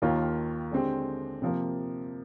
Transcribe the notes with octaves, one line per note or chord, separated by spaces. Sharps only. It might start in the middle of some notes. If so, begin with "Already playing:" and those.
D#2 D#3 A#3 F4
D3 G#3 C4 G4
C3 F3 A#3